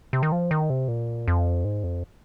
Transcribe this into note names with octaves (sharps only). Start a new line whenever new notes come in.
C3
D#3
F3
D#3
C3
A#2
F2
G#2
F2